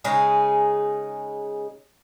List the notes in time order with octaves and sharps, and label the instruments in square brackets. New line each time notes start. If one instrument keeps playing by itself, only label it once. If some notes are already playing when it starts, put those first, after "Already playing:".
[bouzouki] C#3 G#3 D#4 G#4